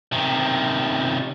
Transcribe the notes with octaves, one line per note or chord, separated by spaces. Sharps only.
C3 D#3